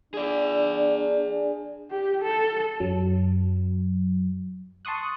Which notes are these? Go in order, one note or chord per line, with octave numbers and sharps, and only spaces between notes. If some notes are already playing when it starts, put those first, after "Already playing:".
D4 G#4 D5
G4
A4
F#2 F#3
A5 C6 C#6 D#6 F#6